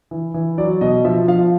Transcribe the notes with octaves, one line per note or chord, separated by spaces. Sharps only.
E3
E3
F#3 D5
B2 D#5
F3 E5
F3 F5